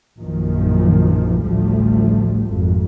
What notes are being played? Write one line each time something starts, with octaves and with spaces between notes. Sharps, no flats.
A#1 F#2 A#2 D#3 F3 F#3
A1 D2 F3 G3 A3
G#1 F2